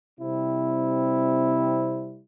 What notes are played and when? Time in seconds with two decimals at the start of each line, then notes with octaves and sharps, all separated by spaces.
0.20 C3 G3 C4 E4